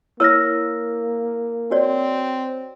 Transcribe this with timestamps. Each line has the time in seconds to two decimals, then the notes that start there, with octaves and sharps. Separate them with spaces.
0.20 A#3 E4 A#4 C#5 E6 F6 A#6
1.71 C4 F#4 C#5 D5